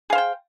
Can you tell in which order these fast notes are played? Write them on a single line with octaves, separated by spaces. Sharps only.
G#4 F5 C5 G5